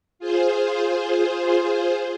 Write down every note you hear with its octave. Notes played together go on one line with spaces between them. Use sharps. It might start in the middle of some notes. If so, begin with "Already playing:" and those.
F4 G#4 C5